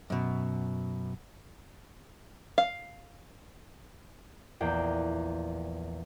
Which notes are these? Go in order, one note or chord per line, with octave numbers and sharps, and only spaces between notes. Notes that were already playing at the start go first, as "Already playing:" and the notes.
F#2 B2
F5
A#1 E2 A#3 D5 G5